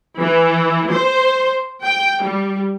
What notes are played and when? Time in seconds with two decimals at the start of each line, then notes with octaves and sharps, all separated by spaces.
0.20 E3
0.91 C5
1.84 G5
2.23 G3